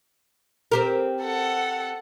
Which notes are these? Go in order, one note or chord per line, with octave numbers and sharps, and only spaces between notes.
C4 G4 A#4
A4 F#5